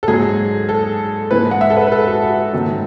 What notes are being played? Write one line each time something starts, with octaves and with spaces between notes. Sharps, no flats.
A4
G#2 F#3 G#4
A4
G#2 E3 B4
F#5
E5
A4
B4
B4
A4
F#4
F#4
G#2 D#3 F#3